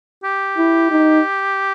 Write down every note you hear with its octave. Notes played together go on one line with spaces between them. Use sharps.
G4
E4
D#4